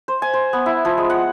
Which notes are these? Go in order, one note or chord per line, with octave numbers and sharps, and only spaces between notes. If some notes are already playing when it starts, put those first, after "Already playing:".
C5
G#5
C5
B3
E4
F3
G#3
F#5